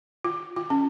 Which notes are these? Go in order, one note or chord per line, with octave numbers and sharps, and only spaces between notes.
F4
F4
C#4